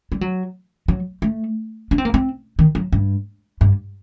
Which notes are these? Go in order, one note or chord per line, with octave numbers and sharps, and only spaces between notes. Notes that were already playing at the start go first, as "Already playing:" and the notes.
G3
F#3
F#3
A3
D4
C4
A#3
C4
D#3
F#3
G2
G2